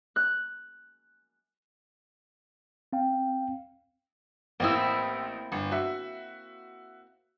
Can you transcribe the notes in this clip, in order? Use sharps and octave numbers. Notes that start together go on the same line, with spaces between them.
F#6
C4 F5 G5
A1 A#3 C4 E4 D#6 E6
G1
F#4 E5